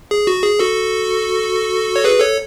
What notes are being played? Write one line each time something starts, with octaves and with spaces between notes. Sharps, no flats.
G#4
F#4
G#4
F#4 A4
C#5
G#4 B4
A4 C#5